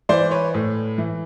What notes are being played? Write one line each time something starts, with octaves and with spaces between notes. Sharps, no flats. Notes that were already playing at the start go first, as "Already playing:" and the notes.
E3 C5 D5
B4 C#5
A2
E3